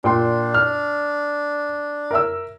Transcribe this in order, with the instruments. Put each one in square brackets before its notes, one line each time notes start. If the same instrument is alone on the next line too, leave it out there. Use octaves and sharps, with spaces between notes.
[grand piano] A#2 G5 C6 [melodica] D4
[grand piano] F6
A#4 E5 E6